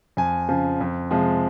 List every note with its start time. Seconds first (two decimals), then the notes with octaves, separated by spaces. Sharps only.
0.17 F2 G#5
0.49 C#3 F3
0.81 F2
1.11 C3 F3 G#3